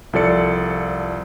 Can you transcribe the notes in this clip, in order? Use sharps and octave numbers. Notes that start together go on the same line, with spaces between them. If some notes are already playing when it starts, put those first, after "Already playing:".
C2 F3 A4 D5 C#7